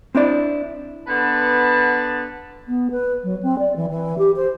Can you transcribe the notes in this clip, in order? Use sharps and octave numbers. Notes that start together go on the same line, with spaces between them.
C4 D4 E4 D5
D3 B3 B4 A5
B3
B4
F#3
C4
D5
E3
E3
G4
C5